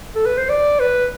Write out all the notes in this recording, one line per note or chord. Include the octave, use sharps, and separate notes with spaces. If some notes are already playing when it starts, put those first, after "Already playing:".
A4
B4
C5
D5
B4